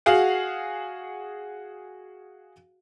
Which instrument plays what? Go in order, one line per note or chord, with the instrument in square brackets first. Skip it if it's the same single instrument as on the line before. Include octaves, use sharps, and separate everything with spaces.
[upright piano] F#4 G#4 F5 F#5